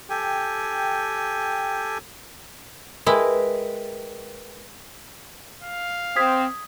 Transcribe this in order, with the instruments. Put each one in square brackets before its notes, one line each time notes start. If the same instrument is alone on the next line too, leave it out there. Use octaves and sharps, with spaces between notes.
[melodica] G4 A4 G5 G#5
[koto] G#3 E4 [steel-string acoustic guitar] A#4 B4 G5
[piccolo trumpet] F5
[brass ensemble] C4 [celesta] D#6 G#6 B6